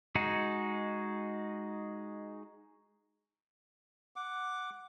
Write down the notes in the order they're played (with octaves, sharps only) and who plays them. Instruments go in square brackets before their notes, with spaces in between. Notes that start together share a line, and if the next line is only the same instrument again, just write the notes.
[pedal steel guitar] G#3 D#4 F#4 G#4
[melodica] F#5 D6